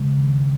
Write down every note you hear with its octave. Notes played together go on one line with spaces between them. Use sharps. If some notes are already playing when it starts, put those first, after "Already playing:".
Already playing: C#3 G#3
D#3